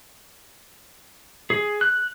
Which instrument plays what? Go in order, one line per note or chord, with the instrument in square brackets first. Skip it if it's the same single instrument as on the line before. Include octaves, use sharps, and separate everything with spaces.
[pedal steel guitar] G#4
F#6